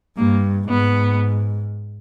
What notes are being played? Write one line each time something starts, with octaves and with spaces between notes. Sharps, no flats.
G2 A#3
G#2 B3